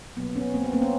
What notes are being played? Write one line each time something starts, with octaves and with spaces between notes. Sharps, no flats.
B2 F#3 A#3 B3
B3 C#4
A#3 C4
B3
A#3 C4
B3 C#4